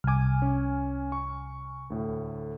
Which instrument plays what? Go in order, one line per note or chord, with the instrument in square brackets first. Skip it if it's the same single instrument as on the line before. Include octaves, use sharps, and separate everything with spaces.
[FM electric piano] C2 G#5 [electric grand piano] D6 F6
[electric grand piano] C#4
C#6
D2 A2